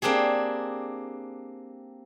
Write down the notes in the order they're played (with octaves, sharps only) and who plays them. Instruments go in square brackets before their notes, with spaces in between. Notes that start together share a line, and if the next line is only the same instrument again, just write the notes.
[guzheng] A#3 C4 D4 G4 G#4